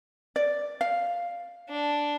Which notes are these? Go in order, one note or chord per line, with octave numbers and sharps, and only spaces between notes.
D5
F5
D4